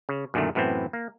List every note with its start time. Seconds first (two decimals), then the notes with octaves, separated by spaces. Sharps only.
0.09 C#3
0.34 F#2 A#2 D3 D#3 A3
0.55 F#2 A2 E3 B3 C4
0.93 A#3